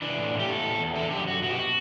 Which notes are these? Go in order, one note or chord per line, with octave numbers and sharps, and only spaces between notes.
E3 D4
A2
A2
G4
B2 A4
E2
E2
D3 A4
F#2 G4
F#2 F#4
B2 F#4
G4
F#4